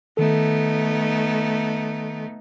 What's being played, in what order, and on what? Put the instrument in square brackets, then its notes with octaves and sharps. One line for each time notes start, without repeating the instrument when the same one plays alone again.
[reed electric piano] D#3 A4 [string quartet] A3 B3 D#4